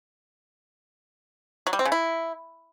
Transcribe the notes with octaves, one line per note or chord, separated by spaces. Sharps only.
F#3
G3
C4
C#3
E4